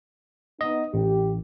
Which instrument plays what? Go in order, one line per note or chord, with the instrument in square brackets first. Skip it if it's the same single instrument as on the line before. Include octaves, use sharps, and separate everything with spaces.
[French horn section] B3 D#4 [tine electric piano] D#5
[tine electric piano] A1 [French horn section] G4